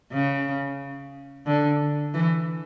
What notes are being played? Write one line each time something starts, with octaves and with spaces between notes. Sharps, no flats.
C#3
D3
E3